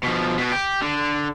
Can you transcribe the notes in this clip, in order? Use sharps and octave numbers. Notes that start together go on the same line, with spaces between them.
B2 F3
B2 F#4
G4
D3